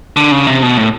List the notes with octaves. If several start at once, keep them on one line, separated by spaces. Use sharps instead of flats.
D3
C#3
C3
B2
A2